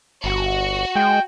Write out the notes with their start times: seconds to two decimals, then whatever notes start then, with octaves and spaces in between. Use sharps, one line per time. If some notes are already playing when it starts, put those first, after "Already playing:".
0.24 G1 F#4
0.95 G#3 G5